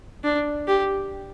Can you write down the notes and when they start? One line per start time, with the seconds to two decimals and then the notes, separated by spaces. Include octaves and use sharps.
0.24 D4
0.68 G4